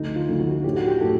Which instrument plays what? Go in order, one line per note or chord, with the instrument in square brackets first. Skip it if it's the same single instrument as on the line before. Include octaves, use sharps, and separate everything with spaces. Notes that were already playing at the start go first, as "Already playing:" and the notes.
Already playing: [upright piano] D2 [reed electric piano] D#4
[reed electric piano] F4
[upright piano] D2
[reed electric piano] F#4
[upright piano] A2 [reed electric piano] G4
[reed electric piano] F#4
G4
[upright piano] A2 [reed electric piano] A4